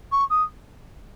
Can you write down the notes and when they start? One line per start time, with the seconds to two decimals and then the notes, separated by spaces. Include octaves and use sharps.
0.11 C#6
0.30 D#6